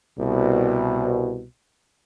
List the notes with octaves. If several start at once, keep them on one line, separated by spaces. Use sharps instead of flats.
C2 B2